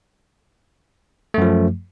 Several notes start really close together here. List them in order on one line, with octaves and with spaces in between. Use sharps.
A3 F#2 F3